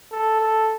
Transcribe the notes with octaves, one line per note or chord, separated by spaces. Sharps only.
A4
A4